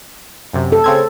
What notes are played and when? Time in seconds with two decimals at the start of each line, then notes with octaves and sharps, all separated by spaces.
0.53 F#2 C3
0.72 A4
0.84 C#3 C4 G#6